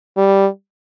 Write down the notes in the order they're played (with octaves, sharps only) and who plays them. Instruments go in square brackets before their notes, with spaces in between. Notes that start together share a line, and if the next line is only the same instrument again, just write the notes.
[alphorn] G3